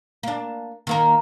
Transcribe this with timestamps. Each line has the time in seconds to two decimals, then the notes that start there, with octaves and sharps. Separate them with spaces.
0.23 A#3 D4
0.87 D#3 A#3 A#4